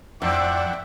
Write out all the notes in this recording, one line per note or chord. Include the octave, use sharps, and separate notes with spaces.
F2 G#2 C4 D4 D5 E5 F#5 G5